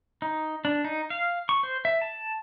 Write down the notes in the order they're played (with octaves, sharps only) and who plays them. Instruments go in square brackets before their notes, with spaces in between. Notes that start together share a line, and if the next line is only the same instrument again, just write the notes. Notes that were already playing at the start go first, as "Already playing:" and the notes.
[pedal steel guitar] D#4
D4
D#4
F5
C#6
C5
E5
A5